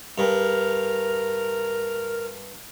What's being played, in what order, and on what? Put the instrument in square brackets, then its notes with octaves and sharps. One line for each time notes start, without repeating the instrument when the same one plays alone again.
[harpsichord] G2 [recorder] A#4